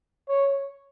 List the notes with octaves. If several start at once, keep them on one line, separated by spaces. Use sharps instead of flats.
C#5